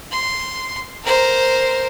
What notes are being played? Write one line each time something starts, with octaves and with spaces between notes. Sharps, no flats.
C6
A#4 C5